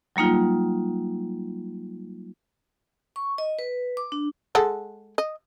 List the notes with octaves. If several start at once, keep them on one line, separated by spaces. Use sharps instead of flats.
F#3 G3 A#3 D#4 F4
C#6
D#5
B4
D6
D4
G#3 A4 F#5
D#5